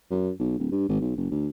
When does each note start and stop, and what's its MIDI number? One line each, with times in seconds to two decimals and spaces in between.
0.11 0.31 42
0.39 0.55 35
0.58 0.70 26
0.72 0.84 43
0.89 0.99 32
1.01 1.12 35
1.16 1.31 30
1.31 1.48 38